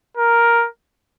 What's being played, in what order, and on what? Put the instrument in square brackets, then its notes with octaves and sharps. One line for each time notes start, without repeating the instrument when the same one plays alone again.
[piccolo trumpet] A#4